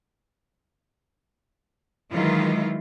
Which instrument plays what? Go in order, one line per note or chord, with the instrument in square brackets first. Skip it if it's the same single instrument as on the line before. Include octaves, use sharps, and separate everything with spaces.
[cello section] D#3 E3 F#3 G#3 E4 F4